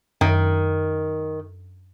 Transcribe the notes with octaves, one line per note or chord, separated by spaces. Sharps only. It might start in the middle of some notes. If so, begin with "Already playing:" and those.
F#2 D#3